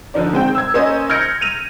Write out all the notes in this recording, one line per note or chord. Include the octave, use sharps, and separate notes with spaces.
D3 F3 D#4 D5
D#3 G#3 C4 G5
E6 G#6
A#3 C#4 C5 D#5
F6 G6 G#6 A#6 C#7 D7
D#7 F7